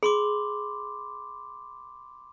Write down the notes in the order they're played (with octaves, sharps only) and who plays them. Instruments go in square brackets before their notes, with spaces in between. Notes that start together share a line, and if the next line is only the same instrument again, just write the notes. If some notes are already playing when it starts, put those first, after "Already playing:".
[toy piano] G#4 [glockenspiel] B5 C6 D6